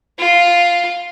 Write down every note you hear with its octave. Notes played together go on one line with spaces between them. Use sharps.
F4